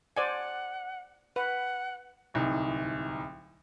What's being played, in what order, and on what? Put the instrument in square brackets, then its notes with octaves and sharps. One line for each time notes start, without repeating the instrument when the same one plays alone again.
[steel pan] C5 D5 G#5 [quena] F#5
[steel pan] B4 [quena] F#5
[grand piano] D1 C2 D#4